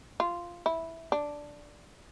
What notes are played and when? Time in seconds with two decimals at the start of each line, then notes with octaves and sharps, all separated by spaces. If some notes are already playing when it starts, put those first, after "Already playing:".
0.20 F4
0.66 E4
1.12 D4